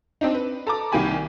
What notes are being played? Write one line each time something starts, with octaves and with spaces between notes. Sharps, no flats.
C4 D4 D#4
B4
A4 A#5 D6
C2 D#3 A#3 G4 G#5 B5